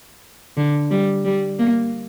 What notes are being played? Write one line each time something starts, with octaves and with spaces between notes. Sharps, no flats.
D3
G3
G3
A#3